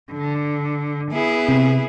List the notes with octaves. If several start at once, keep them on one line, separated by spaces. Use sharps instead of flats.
D3
B3 E4 G#4
C3